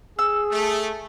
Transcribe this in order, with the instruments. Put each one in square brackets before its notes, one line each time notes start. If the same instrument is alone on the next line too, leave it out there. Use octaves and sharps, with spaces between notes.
[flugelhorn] G#4 [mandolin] E6
[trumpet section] A3